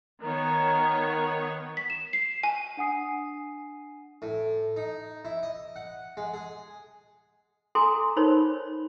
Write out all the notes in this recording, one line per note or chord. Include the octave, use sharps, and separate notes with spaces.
D#3 B3 A#4 C#5
B6
E7
C7
G#5
D4 F#5 G#5 D#6 C7
A2
D#4
E4
D#5
F#5
G#3
G#4
A4 G#5 A#5 C6 D6
D#4 A#4 C5 C#5 B5